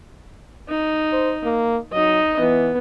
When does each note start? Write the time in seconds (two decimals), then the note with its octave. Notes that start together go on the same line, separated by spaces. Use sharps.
0.68 D#4
1.12 C5
1.44 A#3
1.93 F#3 D#4 D#5
2.40 E3 B3